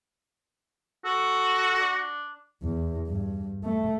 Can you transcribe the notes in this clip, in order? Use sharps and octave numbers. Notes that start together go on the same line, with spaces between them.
F#4 A4
D4
E2
G2
A3